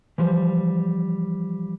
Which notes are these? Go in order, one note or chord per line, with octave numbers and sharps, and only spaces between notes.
E3 F3 G3 C5